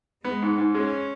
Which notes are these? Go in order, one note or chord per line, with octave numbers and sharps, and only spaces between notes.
G#3 B3
G#2
G#2
G#3 C#4